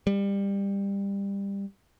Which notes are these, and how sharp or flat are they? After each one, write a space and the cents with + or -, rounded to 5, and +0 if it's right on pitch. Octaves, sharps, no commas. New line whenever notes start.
G3 +20